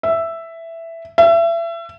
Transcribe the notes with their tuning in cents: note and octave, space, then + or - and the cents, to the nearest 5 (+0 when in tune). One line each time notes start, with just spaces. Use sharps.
E5 +5
E5 +30